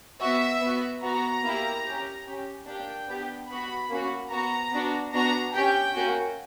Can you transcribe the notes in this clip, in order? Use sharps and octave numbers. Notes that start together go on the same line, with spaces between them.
B3 F#4 E5
B3 F#4
B3 F#4 A#5
A#3 E4 G4
C#4 G4
C#4 G4
A#3 D4 G4 G5
B3 D4 G4
B3 F#4 B5
A#3 C#4 F#4
B3 F#4 A#5
B3 D4 F#4
B3 D4 F#4 A#5
C#4 G4 G5
A#3 C#4 F#4